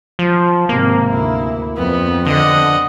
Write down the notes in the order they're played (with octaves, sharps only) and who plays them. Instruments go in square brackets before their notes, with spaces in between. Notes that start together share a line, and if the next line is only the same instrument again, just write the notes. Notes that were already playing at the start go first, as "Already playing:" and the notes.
[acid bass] F3
[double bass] G#1 C3 [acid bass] A#3
[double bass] D2 E4
[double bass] F2 [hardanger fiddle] B3
[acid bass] D3 [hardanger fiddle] D#5 F#5